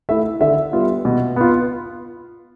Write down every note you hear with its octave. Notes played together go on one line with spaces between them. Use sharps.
A3 E4 E5
D3 E5
G3 B3 F4
B2
B3 F4